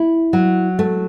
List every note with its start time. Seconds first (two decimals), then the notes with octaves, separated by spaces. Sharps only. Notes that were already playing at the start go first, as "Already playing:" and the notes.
Already playing: E4
0.33 F#3
0.79 A3